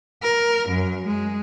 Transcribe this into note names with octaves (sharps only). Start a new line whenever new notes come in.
A#4
F#2
G#3